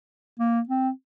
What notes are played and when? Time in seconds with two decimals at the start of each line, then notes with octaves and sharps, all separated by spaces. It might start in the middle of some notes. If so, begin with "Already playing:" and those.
0.39 A#3
0.69 C4